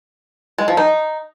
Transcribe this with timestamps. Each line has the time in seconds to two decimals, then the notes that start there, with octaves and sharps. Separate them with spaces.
0.58 G#3
0.68 F3
0.77 D#4